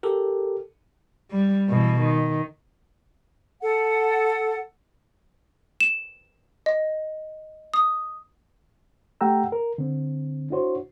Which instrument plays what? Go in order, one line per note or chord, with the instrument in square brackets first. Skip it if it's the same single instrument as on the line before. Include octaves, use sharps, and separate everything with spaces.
[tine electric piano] G4 A4 A#4
[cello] G3
B2 E3
D#3
[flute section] A4 F#5
[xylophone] E7
D#5
D#6
[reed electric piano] A3 G4 F#5 G5 A#5 E6
A#4
D3 C4
D4 E4 F#4 C5 C#5